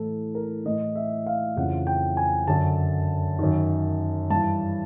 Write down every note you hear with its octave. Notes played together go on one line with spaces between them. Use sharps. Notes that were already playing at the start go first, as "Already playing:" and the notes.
Already playing: A2 E3 A4
A#4
A2 E3 D#5
E5
F5
F2 C#3 E3 F#5
G5
G#5
F#2 D3 A5
F#2 D#3
G2 E3 A5